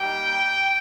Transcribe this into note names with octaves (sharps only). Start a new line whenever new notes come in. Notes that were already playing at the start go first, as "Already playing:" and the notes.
Already playing: G3 A#3 D#4 G4 G5